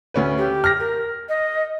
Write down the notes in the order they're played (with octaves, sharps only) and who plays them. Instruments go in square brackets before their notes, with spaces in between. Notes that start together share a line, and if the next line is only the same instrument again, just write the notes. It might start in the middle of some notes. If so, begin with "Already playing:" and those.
[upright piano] D2 C#4 B4
[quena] G4
[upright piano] F6 A#6
[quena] A#4
D#5